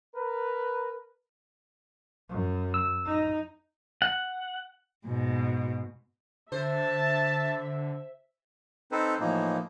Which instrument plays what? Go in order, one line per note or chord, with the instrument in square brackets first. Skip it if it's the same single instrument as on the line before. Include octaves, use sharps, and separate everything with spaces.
[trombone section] A#4 B4
[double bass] F#2
[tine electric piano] E6
[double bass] D#4
[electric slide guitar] F#5
[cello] G#2 B2
[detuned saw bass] D3 [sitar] C5 [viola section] E5 [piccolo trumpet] A5
[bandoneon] C4 D#4 A4 B4 C5
A2 E3 F3 A#3 D#4